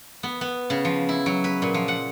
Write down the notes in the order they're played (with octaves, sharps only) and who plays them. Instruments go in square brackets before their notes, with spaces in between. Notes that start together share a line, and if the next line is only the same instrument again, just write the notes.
[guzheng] B3
B3
C#3
F3
E4
F#3
B4
A#2
F3
F#5